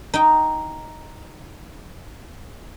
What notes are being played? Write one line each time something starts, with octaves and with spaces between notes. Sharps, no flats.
D#4 G5